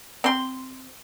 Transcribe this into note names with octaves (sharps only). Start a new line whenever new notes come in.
C4 C6